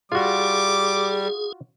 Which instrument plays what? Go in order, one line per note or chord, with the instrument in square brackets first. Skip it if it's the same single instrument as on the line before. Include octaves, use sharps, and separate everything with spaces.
[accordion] G3 [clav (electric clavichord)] F4 F#4 [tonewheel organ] G#4 [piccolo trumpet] D6